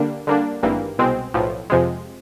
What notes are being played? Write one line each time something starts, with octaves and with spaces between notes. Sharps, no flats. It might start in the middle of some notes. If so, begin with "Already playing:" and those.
Already playing: D3 G3 A#3 D4
D3 G3 A#3 D4
G#1 G2 E3 G3 A#3
C2 B2 G#3 C4
B1 A2 F3
F2 C3 F3 G#3